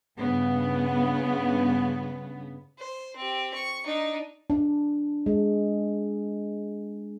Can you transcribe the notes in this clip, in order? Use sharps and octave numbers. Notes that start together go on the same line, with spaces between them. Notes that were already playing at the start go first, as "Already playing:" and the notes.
G2 C#3 B3
C5
C4 G4
C#6
D4 D#4
D4
G#3